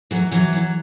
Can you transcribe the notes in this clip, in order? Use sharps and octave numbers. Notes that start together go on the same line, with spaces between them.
E3 F#3
E3 F#3
F#3